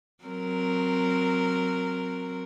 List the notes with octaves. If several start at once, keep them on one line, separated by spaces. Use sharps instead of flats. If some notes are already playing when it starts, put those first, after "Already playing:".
F#3 C4 A#4